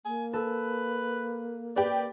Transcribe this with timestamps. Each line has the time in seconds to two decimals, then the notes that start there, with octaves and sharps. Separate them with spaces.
0.06 A#3 G#5
0.33 A4 B4
1.76 G4 B4 D5